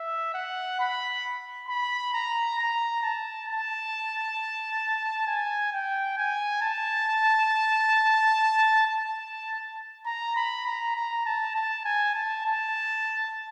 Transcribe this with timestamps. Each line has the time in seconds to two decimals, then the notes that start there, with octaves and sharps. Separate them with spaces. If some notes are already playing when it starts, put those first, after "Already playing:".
Already playing: E5
0.34 F#5
0.79 B5
1.69 B5
2.14 A#5
2.59 A#5
3.03 A5
3.48 A5
5.27 G#5
5.73 G5
6.18 G#5
6.62 A5
8.86 A5
10.06 A#5
10.36 B5
10.66 A#5
10.96 A#5
11.26 A5
11.55 A5
11.85 G#5
12.15 A5
12.45 A5